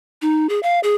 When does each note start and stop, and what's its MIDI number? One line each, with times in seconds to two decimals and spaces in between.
0.22 0.47 63
0.49 0.60 68
0.63 0.80 77
0.83 0.95 68